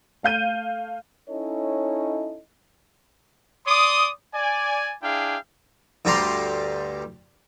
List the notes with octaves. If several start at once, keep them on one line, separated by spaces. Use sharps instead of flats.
A3 F5 G6 D#7
C#4 D#4 E4 A4 C#5 D#5
D5 C6 D6 D#6
D5 G#5
D4 E4 G#4 F5 G5
D2 G2 G3 G4 A#5 C6